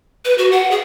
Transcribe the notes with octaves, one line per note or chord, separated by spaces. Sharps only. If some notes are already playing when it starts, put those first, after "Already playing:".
B4
F#4
F#5
G#4